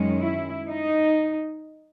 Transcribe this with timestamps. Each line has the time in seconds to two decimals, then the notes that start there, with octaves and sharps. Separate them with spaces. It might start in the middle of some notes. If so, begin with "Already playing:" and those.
Already playing: F#2 D#3 G#3 C#4
0.19 E4
0.67 D#4